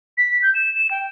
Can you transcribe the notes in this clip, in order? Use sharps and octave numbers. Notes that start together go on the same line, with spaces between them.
B6
G6
E7
E7
G5